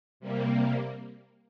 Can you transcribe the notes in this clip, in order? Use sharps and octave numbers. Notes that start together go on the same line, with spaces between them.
C3 G3 A#3